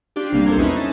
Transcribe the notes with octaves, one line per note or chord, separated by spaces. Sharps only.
D4 F4 G4
A#1 C3 G3 A#3 F5
B1 E2 A4 C5 C6 G#6
C#4 D#4 E4 B4 D#5
G#5 A5